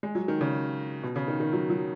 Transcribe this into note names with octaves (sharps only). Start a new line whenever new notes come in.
G#3
F#3
D#3
C#3
B2
C#3
D#3
D#3
F#3
F#3